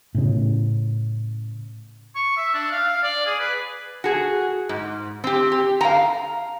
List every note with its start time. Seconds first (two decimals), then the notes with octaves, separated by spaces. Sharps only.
0.15 A2 C#3
2.15 C#6
2.37 E5
2.54 D4
2.71 F5
2.88 F5
3.03 D5
3.26 G#4
3.40 B4
4.04 F#4 G#4
4.69 G#2
5.24 C4 G4
5.52 G4
5.81 F5 G5 A#5